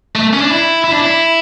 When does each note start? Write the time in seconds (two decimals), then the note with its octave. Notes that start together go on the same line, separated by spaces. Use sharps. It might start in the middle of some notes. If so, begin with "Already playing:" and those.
0.16 A3
0.33 C#4
0.41 D4
0.50 E4
0.84 E4
0.92 D4
0.99 E4